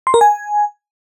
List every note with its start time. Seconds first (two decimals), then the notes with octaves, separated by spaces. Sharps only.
0.07 C6
0.14 A#4
0.21 G#5